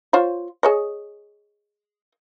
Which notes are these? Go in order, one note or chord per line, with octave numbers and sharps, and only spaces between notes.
F4 C5 C#5
G#4 C#5 D#5